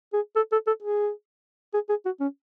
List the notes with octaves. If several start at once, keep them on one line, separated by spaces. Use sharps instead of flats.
G#4
A4
A4
A4
G#4
G#4
G#4
F#4
C#4